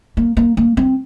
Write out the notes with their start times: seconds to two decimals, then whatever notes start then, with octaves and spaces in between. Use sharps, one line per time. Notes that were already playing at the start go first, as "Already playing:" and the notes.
0.17 A#3
0.37 A#3
0.57 A#3
0.77 C4